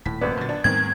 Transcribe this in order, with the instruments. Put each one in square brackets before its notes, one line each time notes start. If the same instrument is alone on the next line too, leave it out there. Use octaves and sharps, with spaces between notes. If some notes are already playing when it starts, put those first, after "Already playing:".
[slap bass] D#1 [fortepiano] A2 [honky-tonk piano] B6
[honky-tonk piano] G#1 A#3 D5 [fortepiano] F#2 B3
[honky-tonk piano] B1 A6 [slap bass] A#2 D3
[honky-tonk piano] D4
[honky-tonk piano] E2 D#3 C4 [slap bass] G#2 G3 A3 [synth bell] G#6